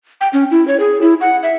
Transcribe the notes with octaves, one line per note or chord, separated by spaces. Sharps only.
G5
C#4
E4
C#5
G#4
E4
F#5
E5